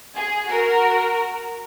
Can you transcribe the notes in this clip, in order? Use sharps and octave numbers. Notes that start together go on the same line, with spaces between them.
G#4
F#4 A#4